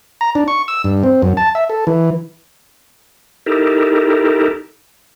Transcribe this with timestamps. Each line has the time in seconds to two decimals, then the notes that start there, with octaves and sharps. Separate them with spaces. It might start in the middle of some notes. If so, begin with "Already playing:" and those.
0.21 A#5
0.35 D4
0.48 C#6
0.68 E6
0.84 G2
1.04 C4
1.22 F#2
1.37 A5
1.55 E5
1.70 A4
1.87 E3
3.46 D#4 E4 G4 A4 A#4